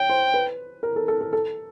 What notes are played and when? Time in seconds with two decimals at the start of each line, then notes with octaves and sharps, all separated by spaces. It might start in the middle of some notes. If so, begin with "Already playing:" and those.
Already playing: C#5 G5
0.09 C5
0.34 B4
0.83 A#4
0.96 A4
1.08 A4
1.21 A4
1.33 A4